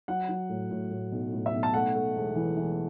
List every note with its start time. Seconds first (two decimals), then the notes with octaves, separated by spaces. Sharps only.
0.08 F#3 F#5
0.29 F#3
0.49 A2
0.71 A2
0.91 A2
1.12 B1
1.33 A2
1.46 E5
1.53 B1
1.63 A5
1.74 A3 F#5
1.95 A3
2.16 E1
2.36 E3
2.57 E3